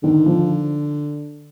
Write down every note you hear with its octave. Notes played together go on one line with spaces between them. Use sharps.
D3 D#3
F3